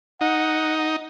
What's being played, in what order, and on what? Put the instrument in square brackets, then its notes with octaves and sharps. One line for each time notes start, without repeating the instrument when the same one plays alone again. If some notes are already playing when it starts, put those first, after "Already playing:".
[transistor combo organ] D#4 [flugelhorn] F#5